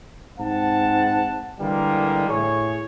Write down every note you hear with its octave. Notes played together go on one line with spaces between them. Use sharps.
G#2 C4 F#5 A5
D3 E3 G3 G#3 A#3
A2 G#4 C#5